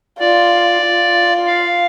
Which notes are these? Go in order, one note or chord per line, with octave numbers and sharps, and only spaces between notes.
F4 D5
F4
F5